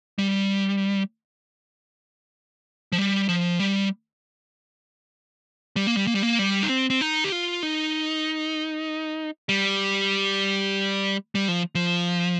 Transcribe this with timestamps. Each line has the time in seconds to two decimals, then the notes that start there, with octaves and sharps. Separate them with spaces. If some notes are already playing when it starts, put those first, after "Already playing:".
0.18 G3
2.92 F3
2.98 G3
3.29 F3
3.59 G3
5.76 G3
5.87 A#3
5.97 G3
6.07 A#3
6.15 G3
6.23 A#3
6.39 G3
6.63 D#4
6.69 C4
6.90 C4
7.01 D#4
7.24 G4
7.32 F4
7.63 D#4
9.49 G3
11.35 G3
11.48 F3
11.75 F3